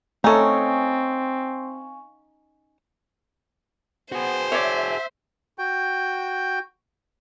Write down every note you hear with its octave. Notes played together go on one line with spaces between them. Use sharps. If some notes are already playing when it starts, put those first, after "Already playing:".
A3 C4 C#4 D#4 A4 F5 G#5 C#6
B3 F#4 G#4 C5
C#5 D5 E5
F#4 G5 G6